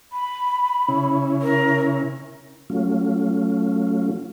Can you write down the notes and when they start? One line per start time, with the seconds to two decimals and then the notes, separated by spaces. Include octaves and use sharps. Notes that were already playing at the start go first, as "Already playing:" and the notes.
0.13 B5
0.88 C#3 C#4 E4
1.42 A#4
2.70 F#3 A3 C#4 F4